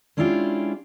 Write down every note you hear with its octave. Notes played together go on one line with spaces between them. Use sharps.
G#3 C#4 D4 E4 F4 G4